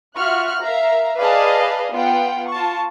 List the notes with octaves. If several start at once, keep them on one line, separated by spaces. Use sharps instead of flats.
F4 F#4 E5 C#6 F6 F#6
A#4 E5 F5 A#5
G#4 B4 D5 D#5 F5 A5
B3 F4 F#5 G5
F4 A5 C#6